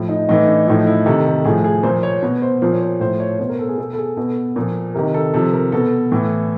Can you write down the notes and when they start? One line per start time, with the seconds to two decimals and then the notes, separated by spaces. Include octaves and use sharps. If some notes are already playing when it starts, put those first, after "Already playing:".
Already playing: A2 F3 E4
0.09 D#4
0.29 A2 E3 D#4
0.48 D4
0.67 A2 F3 D#4
0.87 E4
1.06 C3 D#3 A4
1.26 A4
1.45 A2 F3 G#4
1.64 G#4
1.83 A#2 F3 C5
2.03 C#5
2.23 B2 B4
2.42 C5
2.62 A#2 F3 C5
2.73 C#5
2.81 C5
3.00 A2 F3 C5
3.20 C#5
3.39 B2 C5
3.49 A#4
3.59 A4
3.68 G#4
3.78 B2 A4
3.93 A4
3.98 G#4
4.17 B2 A4
4.56 A#2 F3
4.94 C3 D#3 A#4
5.14 A4
5.34 C3 F3 A4
5.53 A#4
5.72 B2 A4
6.12 A2 E3